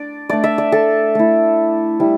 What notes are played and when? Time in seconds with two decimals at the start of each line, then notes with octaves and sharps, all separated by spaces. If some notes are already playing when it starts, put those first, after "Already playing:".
Already playing: D4 D5
0.29 A3 D4 D5
0.44 E5
0.58 D5
0.72 A4
1.15 A3 E4
2.00 G3 E4